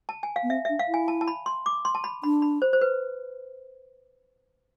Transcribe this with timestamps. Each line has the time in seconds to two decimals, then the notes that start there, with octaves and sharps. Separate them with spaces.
0.09 A5
0.23 G#5
0.36 F5
0.43 B3
0.50 C4 E5
0.65 D4 E5
0.80 F5
0.88 E4
0.94 G#5
1.08 A5
1.21 A5
1.28 B5
1.46 C6
1.66 D6
1.85 C6
1.95 A5
2.04 B5
2.23 D4 B5
2.42 B5
2.62 C5
2.73 C5
2.81 B4